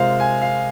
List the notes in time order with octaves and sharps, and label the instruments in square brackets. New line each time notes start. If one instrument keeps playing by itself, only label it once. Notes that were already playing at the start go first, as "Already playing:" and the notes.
Already playing: [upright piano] C3 G#3 F4 A#4 [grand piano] C5 F5
[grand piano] G#5
F5